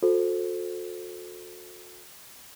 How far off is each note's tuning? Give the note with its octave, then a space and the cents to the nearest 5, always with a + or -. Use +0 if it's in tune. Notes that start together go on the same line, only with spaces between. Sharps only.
F#4 -40 A4 +0 C5 +0